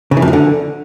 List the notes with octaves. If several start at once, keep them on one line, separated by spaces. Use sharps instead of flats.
C#3
E3
F2
E3
D3